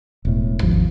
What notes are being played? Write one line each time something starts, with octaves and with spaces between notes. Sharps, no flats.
E1 A2
G#1 D#2 F3